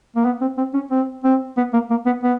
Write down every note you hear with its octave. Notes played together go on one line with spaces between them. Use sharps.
A#3
B3
C4
C4
C#4
C4
C4
B3
A#3
A#3
B3
B3